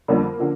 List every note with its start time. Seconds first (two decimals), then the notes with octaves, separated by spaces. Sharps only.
0.08 F2 D3 G3 A#3
0.39 D3 F3